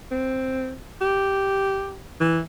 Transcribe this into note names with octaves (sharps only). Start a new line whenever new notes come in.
C4
G4
E3